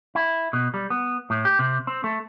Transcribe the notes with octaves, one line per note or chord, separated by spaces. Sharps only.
E4
B2
G3
B3
A2
G4
C3
C4
A3